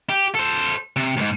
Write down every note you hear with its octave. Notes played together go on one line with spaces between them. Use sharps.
G4
A4 C5
C3
D2 G#2